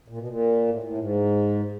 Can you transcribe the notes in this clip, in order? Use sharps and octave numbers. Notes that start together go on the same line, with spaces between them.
A#2
B2
A#2
A2
A2
G#2